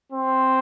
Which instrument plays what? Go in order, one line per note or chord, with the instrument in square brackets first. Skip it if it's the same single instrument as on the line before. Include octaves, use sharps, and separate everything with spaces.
[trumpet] C4